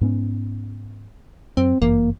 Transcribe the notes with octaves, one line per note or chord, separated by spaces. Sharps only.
G#2 B3 C#4
F#2 C4
G1 F#2 E3 A#3